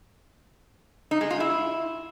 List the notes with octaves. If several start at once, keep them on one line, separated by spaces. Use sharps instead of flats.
D#4
G#3
F4
E4